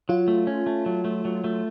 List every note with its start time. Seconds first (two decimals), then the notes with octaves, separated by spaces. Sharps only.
0.09 F#3 F4
0.28 A3
0.47 C#4
0.66 A3
0.86 F#3
1.05 A3
1.25 F#3
1.44 A3